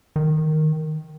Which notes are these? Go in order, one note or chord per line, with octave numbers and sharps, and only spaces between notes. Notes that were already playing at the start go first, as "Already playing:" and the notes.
D#3